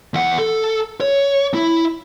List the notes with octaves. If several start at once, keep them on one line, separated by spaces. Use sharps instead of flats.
E2 F#5
A4
C#5
E4